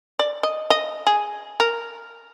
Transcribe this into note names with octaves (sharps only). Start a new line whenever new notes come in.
D5
D#5
D#5
G#4
A#4